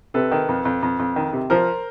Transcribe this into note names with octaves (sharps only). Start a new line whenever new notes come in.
C3 A4 B4
D#3
F2
F2
F2
F2
D#3
C3
F3 A#4 C5